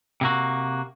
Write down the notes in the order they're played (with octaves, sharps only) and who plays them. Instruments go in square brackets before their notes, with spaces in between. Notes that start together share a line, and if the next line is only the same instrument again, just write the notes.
[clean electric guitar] C3 A#3 F#4